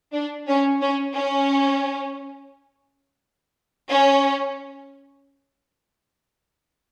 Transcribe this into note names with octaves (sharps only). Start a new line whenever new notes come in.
D4
C#4
C#4
C#4
C#4